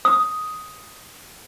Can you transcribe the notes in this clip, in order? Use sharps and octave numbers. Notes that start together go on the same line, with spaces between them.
D#6